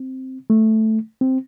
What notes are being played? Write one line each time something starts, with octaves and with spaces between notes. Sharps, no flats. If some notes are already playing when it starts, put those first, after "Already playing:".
Already playing: C4
A3
C4